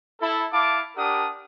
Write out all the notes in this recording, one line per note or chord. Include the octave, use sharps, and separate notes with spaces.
E4 A4
E4 F5 A5 D6
D4 G4 A#4 F#5 D#6